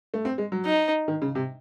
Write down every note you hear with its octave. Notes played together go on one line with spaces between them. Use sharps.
A3
C4
G#3
F#3
D#4
D#3
C#3
C3